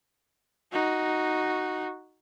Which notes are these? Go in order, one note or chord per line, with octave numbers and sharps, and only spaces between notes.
D#4 F#4